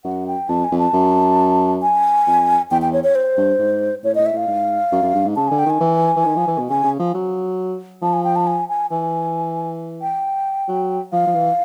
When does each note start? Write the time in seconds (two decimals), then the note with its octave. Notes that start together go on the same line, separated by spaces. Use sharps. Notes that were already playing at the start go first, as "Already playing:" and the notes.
0.04 F#2 F#5
0.27 G5
0.49 F2 A5
0.64 G#5
0.72 F2
0.79 A5
0.93 F#2
1.82 G#5
2.27 F2
2.71 E2 G5
2.82 G5
2.93 C#5
3.04 C#5
3.15 C5
3.37 G2
3.59 G#2
4.04 A2 C#5
4.15 A2 D#5
4.26 E5
4.33 A2 F5
4.48 G#2
4.92 F#2
5.03 F#2
5.14 G2
5.26 G#2
5.36 C#3 A5
5.48 D3 G#5
5.59 G5
5.66 D#3 G#5
5.80 E3
6.16 E3
6.25 D#3
6.36 F3
6.47 E3
6.58 B2
6.70 C#3 G#5
6.84 C#3
6.99 F3
7.14 F#3
8.02 F3 A5
8.13 G#5
8.24 G5
8.36 A5
8.47 G#5
8.69 G#5
8.91 E3 G#5
10.02 G5
10.68 F#3
11.13 F3 F5
11.27 F3
11.35 E3